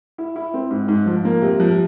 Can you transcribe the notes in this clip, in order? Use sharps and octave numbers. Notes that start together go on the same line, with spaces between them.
E4
E4
C4
G#2
G#2
F3
A#3
C3
F3